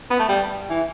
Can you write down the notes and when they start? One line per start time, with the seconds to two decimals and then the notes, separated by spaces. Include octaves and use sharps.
0.10 B3
0.19 A3
0.29 G3
0.70 E3